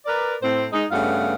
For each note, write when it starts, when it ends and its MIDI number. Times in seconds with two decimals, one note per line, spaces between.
0.06 0.35 70
0.06 0.35 71
0.06 0.35 74
0.42 0.66 45
0.42 0.66 60
0.42 0.66 72
0.72 0.85 56
0.72 0.85 63
0.91 1.35 43
0.91 1.35 49
0.91 1.35 57
0.91 1.35 59
0.91 1.35 77
0.91 1.35 78